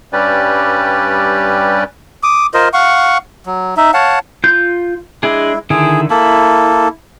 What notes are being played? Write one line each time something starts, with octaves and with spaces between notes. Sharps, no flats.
G2 G3 C#4 G4 B4 D5
D6 D#6
F4 A#4 C5 D#5
F5 F#5 C#6
F#3
D#4 E5
C#5 F5 F#5 A5
F4 G6
G#3 D4 E4 G#4
D3 D#3 E4 G#4
A#3 E4 A4